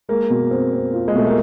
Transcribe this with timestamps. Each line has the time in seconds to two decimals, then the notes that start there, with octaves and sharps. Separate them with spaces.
0.09 G#3 A#3
0.30 B2
0.51 C4
0.72 C4
0.93 F4
1.08 G#3
1.14 B2 A3
1.27 A#3